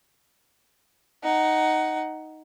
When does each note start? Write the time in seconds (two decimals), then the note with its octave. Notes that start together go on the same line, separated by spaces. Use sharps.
1.23 D#4 F#5